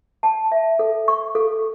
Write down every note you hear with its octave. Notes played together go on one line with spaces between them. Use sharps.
A5
E5
A4
C#6
A4